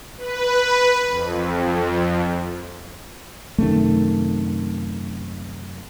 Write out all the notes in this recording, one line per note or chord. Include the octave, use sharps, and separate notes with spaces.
B4
F2
F#2 C3 D#3 A3